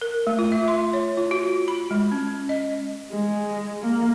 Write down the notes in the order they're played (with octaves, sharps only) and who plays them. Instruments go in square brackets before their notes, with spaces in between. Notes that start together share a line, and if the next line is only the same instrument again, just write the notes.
[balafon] A#4
A3
F4
E5
C6
C#5
F4
F#4
B5
G#3
C#4
D#5
[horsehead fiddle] G#3
A#3